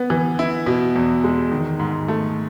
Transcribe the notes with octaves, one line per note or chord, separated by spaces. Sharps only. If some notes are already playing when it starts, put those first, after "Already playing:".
Already playing: B3
E3
E4
B2
E2
G#3
D#3
G#2
A3